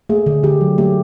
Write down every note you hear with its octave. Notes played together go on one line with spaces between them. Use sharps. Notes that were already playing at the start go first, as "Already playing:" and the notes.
A3 G#4
D3
D3 G4
F#3
A3 G4